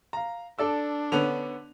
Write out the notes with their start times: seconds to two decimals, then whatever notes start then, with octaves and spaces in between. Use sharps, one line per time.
0.13 F5 A#5
0.59 D4 A4 D5 E6
1.12 D3 B3 C#4 F7